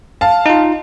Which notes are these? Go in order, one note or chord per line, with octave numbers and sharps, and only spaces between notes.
F5 A5
D#4 F4